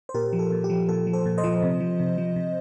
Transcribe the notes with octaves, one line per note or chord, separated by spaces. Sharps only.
C5
A#2 G4 A#4
F3
A4
A#2
G4
F3
A#2 A4
F3
A4 C5
A#2
C5 D#5
F3
C3
F3
C3
F3
C3